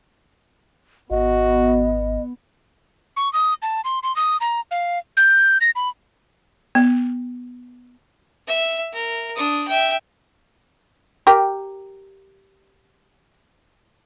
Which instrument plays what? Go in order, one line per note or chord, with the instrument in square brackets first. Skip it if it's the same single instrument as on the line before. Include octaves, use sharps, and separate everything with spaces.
[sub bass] G#1 [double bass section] B3 [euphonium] F#4 [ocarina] D#5
[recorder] C#6
D#6
A5
C6
C6
D#6
A#5
F5
G6
A#6
B5
[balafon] B3
[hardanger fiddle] E5
A#4
D4 D#6
E5 G5
[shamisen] G4 A#4 G5